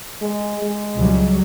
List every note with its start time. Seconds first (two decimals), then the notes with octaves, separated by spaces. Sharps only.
0.21 G#3
0.62 G#3
0.97 C#2 F#3 G3